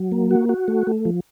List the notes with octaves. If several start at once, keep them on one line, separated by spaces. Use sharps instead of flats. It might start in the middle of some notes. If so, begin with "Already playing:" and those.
Already playing: F#3
A#3
F#4
F#4
A3
A3
F3